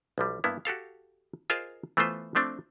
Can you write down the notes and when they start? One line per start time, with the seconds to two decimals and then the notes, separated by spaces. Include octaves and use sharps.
0.18 B1 F3 G3
0.44 G2 A#3 B3 E4
0.65 F#4 G4 A4 F5
1.50 F4 G#4 A#4 C5 D#5 F5
1.97 E3 A3 B3 F4 C5
2.35 F3 A3 C4 D4